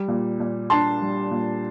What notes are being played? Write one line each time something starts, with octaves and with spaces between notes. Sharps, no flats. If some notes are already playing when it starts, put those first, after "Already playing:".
Already playing: G3
A#2
A#2
D4 A5 C6
G3
A#2